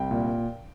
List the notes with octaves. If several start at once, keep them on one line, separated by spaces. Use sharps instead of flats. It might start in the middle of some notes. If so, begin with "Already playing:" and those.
Already playing: C2 G5
A#2